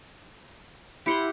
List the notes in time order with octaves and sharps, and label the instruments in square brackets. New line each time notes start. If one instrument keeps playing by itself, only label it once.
[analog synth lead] E4 [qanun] G4 F#5 C6